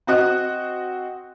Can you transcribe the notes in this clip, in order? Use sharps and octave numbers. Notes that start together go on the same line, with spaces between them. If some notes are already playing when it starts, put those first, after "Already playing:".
C4 F#4 D#5 F#6